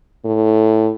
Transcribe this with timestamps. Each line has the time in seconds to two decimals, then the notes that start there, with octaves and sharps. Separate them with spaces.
0.25 A2